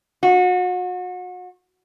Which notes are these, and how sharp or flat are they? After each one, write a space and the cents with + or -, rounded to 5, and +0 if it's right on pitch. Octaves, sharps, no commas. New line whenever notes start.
F#4 -35